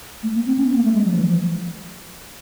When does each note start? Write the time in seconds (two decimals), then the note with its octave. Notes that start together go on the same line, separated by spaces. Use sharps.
0.23 A3
0.35 A#3
0.46 C4
0.58 C#4
0.67 B3
0.76 A#3
0.84 A3
0.94 G#3
1.05 F#3
1.12 F3
1.16 E3
1.28 F3